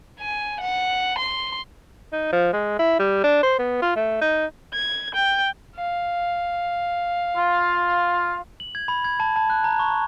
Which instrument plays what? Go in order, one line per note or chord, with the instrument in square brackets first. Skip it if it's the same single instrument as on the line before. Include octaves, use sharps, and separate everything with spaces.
[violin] G#5
F#5
C6
[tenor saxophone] D#4
F3
G#3
E4
G3
D4
C5
B3
F4
A3
D#4
[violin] G#6
G5
[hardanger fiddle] F5
[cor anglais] F4
[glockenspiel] F#7
G#6
B5
G#6
A5
A5
F#6
A#5
C#6